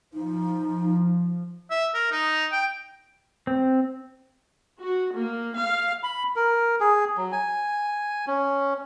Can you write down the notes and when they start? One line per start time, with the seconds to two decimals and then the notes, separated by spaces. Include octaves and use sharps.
0.14 F3 D#4
1.70 E5
1.94 A#4
2.12 D#4
2.51 G5
3.47 C4
4.83 F#4
5.16 A#3
5.58 F5
6.03 B5
6.36 A#4
6.80 G#4
7.18 F#3
7.32 G#5
8.27 C#4